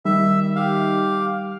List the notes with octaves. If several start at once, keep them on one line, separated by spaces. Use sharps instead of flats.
D#3 G3 E5
G4 F5